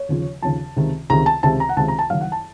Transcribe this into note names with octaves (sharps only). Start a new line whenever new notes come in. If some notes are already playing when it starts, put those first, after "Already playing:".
Already playing: C#5
D#2 C#3 F3
D#2 C#3 F3 A5
C#2 C3 D#3
C#2 C3 D#3 A#5
A5
C#2 C3 D#3 A5
A#5
F#5
C#2 C3 D#3 A5
A#5
A5
F#1 F#2 D#3 F5
F#5
A5